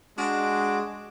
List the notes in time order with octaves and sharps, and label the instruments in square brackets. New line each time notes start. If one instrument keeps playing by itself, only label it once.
[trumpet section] G#3 [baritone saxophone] D4 [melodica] F#4 D6